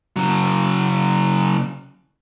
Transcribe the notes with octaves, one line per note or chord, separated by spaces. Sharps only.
C#3 F#3